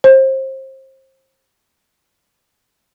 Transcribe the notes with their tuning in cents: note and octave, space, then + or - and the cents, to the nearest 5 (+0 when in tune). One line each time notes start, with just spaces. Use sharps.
C5 +30